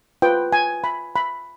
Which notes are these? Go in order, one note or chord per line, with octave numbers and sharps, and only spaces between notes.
F4 B4 G5
G#5
B5
B5